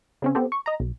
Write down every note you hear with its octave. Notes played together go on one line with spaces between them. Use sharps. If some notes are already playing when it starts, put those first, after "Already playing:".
C#3 C4 C#4
B3 C4 G4 A4
C#6
D#5 A#5
B1